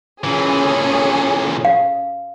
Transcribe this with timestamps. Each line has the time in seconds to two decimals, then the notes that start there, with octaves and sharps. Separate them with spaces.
0.24 A#2 E3 C#4 G#4 A4
1.65 F5